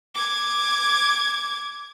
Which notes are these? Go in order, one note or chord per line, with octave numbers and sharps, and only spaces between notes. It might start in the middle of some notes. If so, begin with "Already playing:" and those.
D6 G#6